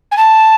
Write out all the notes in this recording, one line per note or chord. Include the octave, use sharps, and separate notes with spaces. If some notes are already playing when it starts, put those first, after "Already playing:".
G#5
A5